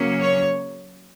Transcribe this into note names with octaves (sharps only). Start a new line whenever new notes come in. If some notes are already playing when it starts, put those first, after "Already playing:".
Already playing: C#3 F#3 A#3 C#4
C#5